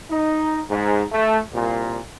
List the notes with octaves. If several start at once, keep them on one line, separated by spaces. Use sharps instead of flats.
D#4
G#2
A3
C2 A#2